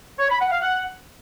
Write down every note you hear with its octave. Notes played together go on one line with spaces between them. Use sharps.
C#5
B5
F#5
F5
F#5